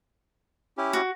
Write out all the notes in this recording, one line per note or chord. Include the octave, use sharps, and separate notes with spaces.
C#4 E4 G4
F#4